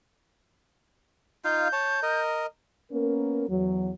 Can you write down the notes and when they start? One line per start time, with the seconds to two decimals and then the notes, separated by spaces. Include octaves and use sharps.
1.45 D#4 F4 F5 G6
1.73 C#5 A5
2.03 A#4 D#5
2.92 A#3 B3 C#4 A#4
3.49 E2 F#3